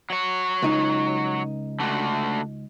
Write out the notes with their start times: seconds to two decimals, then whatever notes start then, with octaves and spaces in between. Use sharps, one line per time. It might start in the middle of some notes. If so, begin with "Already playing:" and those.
0.10 F#3 C#5
0.62 C#2 D#4
1.80 D3 A3 F#4